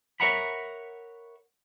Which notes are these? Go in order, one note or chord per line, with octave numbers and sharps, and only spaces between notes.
A#4 C#5 E5 F#5 A#5 B5